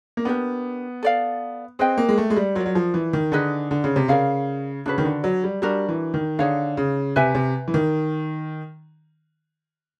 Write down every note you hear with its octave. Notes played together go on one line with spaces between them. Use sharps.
A#3
B3 D4 G4 A#4
A4 D5 F5
C4 G#4 B4 D#5 G5
A#3
G#3
A3
G#3
G3
F#3 F4 A#4 D5
F#3
F3
E3
D#3
D3 D#4 G#4 B4 D#5
D3
C#3
C3
C#3 A#4 D5 F5
C#3 D4 F#4 B4
D#3
D3
F#3
G3
G3 D4 F#4 A#4
E3
D#3
D3 D#4 G#4 C#5 F5
C#3
C3 B4 E5 G#5
C3
E3
D#3